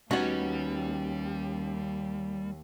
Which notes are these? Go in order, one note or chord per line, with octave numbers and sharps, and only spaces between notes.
D#2 G3 B3 C#4 D#4 F#4